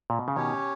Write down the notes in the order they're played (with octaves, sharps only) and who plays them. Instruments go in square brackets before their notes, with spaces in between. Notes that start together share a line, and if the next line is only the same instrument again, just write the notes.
[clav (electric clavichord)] A#2
B2
C#3
[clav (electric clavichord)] B2 D#3 [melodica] C#4 G4 C#5